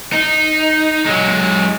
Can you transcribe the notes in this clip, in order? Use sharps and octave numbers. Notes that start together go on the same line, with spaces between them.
D#4
F#3 G#3